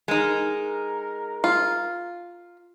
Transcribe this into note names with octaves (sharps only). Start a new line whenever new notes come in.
G#3 D#4 A#4
F4